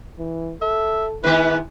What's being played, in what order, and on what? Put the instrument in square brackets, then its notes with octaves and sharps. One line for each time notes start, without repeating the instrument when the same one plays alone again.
[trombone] E3
[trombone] A4 [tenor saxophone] E5
[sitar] G#2 D#3 B3 [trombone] E4 [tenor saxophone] B4